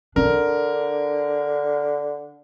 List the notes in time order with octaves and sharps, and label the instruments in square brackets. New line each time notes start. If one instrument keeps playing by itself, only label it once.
[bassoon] D3 [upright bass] D4 [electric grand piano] A#4